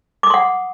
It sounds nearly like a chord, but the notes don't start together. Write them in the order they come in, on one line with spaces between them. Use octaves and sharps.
D6 D#6 C6 F#5